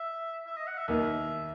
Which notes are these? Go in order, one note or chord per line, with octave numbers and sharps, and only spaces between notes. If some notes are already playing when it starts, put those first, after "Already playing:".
Already playing: E5
E5
D#5
F#5
E5
D#2 D#3 A#3 D#4 E5